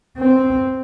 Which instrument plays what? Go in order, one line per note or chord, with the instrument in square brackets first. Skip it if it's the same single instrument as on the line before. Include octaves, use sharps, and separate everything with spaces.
[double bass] C4